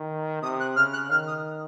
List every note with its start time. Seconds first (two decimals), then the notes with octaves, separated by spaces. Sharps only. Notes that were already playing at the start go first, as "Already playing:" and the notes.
Already playing: D#3
0.42 C3 D#6
0.60 F#6
0.76 C#3 F6
0.93 F#6
1.10 D#3 F6
1.27 D#6